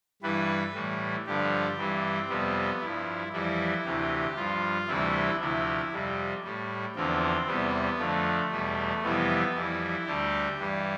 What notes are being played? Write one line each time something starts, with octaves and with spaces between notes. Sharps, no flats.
G2 E3 G3 B4
A2 E3 G3
G2 D3 F3 G4
G2 E3 G3 C4
F2 C3 G3 B3
G2 E4
F3
F2 E3 G3 E4
D2 C3 E3 G4
G2 F3 F4
D2 C3 E3 G3 E4
D2 C3 F3 E4
F2 C3 G3
A2 G3
E2 D3 F3 C4
E2 C3 G3 B3
F2 D3 F3 A3
E2 B2 G3
F2 C3 E3 G3 B3
F2 E3 G3 E4
D2 D3 G3 G4
G2 E3 G3